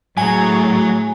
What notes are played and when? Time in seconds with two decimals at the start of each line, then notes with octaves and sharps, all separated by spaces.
0.17 A2 F#3 G#4 G#5 A#5